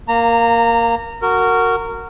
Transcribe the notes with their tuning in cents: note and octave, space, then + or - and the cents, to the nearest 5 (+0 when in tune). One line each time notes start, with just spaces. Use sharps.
A#3 +0 A#5 -25
F#4 +0 A#4 -20